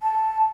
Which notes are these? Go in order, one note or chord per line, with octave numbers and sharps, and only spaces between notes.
A5